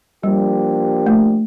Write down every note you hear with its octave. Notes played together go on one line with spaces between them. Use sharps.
F3 G3 A#3 D4 G4
A3